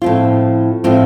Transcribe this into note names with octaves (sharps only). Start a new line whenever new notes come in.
A2 F3 C4 F4
A2 F3 C4 F4